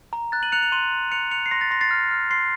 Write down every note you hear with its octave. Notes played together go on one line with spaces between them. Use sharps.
A#5
F#6 A6
D#7 F#7
F#6 C#7 F7
C#7 F7
C6 D#7 F#7
C6
F#6 C#7 F7
F#6 C#7 F7
C7
C6 A#6
A6
C6 A#6
A6 C7
F6
F6
C6 A6 C7